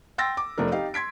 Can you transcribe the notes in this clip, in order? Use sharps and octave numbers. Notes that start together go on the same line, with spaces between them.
G5 C6 E6 A6 A#6
D6
F1 F3 A3 D4 A#4
D#4 G4 F5
C6 G#6 B6 D7